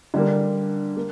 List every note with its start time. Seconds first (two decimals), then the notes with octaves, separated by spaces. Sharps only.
0.14 D3 G3 A#3
0.97 A#3